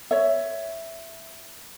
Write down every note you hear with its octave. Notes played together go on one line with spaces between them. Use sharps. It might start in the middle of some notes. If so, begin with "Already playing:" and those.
C#5 E5